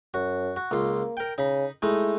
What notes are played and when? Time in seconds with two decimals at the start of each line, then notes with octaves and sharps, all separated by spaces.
0.14 F#2 F#4
0.56 F#4
0.71 C#2 A#3 F4
1.17 A#4 G5
1.38 C#3 D#4 B5
1.82 G#3 A3 D#4 E4